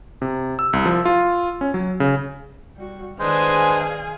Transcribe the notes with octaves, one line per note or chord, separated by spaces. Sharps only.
C3
E6
C2
F3
F4
C#4
F#3
C#3
G3 F#4
D#3 G#3 D4 G#4 B4 C5 F5 G#5